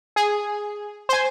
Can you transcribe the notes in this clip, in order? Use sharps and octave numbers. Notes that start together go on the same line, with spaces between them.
G#4
C5 G#5